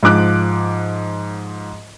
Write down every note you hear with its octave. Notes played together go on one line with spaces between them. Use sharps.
G#2 F3 D6 F#6